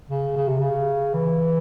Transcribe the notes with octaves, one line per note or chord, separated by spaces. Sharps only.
C#3
C#3
C3
C#3
E3